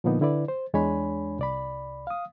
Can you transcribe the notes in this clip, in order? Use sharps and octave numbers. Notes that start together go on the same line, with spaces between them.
A#2 D3 F3 A#3 B3 D#4
D3 E4 B4 D5
C5
E2 G#3 D4 C#5 G#5 B5
C2 D5 B5
F5 D#6